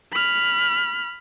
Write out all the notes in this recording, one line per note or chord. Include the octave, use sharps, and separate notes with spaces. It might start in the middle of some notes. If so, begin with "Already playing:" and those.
B5 F6